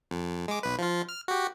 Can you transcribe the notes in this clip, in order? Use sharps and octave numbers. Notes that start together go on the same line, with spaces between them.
F2
G#3 D6
B1 B4
F3 F4
F6
F#4 G4